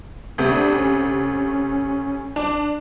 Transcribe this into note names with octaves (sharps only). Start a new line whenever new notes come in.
D2 C3 A3
D4
C#4
D4